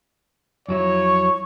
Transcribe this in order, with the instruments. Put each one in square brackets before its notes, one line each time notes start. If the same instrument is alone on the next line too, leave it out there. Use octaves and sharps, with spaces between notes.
[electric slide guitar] F2 F#3 E4 [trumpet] C#5
[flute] C#6